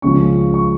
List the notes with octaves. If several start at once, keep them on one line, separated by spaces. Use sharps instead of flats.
C#2 C#3 F3 C#6
C#6